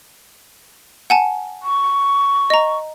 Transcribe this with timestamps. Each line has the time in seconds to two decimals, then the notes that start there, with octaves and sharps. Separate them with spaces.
1.10 F#5 G#5 A5
1.63 C#6
2.50 D#5 A#5